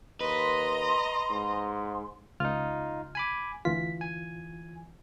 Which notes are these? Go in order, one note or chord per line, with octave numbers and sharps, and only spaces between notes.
D#2 B4 D#5 A#5 C6
G#2
C#2 D#4 F4 F6
G#5 B5 D6
D2 E3 F4 B6
G#5